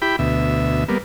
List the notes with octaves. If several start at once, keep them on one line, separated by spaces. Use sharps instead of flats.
E4 G4 G5 B5
D2 B2 E5
G3 A#3 B3